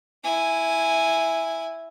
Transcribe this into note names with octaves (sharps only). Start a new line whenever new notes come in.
E4 G#5